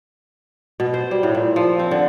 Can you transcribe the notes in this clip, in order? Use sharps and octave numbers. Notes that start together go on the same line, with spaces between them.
B2
C5
G3
A2
A#2
F3
C4
D3